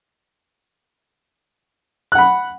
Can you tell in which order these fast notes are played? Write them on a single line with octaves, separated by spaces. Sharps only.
F#6 F#5 B5